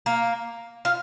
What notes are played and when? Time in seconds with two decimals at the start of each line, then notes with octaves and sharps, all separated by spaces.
0.06 A#3
0.85 F4